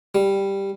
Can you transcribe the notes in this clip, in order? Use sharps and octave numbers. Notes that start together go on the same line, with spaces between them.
G3